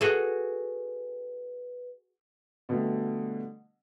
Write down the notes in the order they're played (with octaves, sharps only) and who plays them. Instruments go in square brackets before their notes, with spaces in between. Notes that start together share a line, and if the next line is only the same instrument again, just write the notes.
[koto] F#4 G#4 A4 [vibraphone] B4
[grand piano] B2 D3 G3 A3